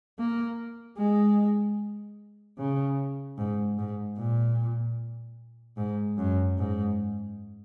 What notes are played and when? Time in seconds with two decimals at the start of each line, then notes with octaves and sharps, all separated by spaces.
0.19 A#3
0.98 G#3
2.58 C#3
3.38 G#2
3.79 G#2
4.18 A#2
5.77 G#2
6.18 F#2
6.58 G#2